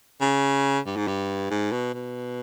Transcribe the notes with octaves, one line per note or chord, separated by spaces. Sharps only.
C#3
G2
G#2
G2
G#2
B2
B2